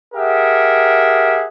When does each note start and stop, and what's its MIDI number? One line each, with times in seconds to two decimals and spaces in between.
0.15 1.47 67
0.15 1.47 68
0.15 1.47 70
0.15 1.47 76
0.15 1.47 78